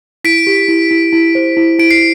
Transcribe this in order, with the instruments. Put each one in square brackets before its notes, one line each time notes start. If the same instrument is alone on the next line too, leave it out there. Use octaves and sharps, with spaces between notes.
[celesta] E4 [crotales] B6 D7
[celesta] G4
E4
E4
E4
C5
E4
[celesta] E4 [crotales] D7
[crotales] C7